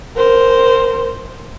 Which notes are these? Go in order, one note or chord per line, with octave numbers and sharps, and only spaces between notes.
A#4 C5